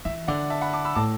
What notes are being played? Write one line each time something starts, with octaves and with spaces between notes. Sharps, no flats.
E3 E5
D3 D5 F#5
E5 A5
F#5 B5
A5 D6
B5 E6
A2 A5 D6